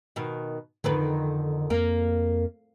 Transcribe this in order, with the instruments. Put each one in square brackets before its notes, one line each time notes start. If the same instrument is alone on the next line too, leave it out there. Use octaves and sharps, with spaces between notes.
[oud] B2 D#3
[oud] F2 D#3 B4 [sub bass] D3
[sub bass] F2 [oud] A#3